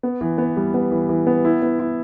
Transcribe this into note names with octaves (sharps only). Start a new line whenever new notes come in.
B3
E3
B3
G3
B3
E3
E3
B3
E4
B3
E4